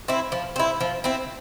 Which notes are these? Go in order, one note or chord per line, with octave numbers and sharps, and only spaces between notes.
C4 E4
F3
C4 E4
F3
C4 E4